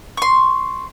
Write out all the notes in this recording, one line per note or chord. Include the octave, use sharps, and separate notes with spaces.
C6 C#6